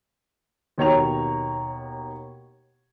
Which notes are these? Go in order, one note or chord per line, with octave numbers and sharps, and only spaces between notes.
D#2 B2 C#5 G5 A#5 F7